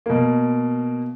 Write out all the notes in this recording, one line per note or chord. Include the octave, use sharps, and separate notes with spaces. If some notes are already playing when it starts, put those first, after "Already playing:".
B2 A#3